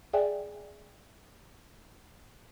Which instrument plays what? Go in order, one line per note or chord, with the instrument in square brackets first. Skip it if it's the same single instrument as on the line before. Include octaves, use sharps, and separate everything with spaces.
[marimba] G#4 D5 E5 G5 G#5